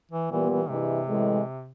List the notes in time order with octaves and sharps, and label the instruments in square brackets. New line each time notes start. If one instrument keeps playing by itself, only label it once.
[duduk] E3
[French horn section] A#2 G3 B3 [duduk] E3
[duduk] E3
[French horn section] G2 E3 G#3 [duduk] C3
[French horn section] A2 E3 G#3